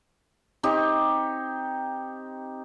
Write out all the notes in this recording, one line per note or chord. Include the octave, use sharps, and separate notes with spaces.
C4 D#4 G4 C#6